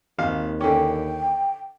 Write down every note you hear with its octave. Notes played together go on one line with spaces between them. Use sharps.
G#1 D#2 F5
D3 C#4 G5